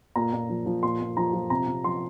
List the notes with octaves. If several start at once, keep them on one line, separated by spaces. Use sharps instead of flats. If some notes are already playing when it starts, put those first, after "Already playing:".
A#2 A#5
A#2
F3
F3
A#2 C6
A#2
F3 A#5
F3
C3 A#5
C3
F3 C6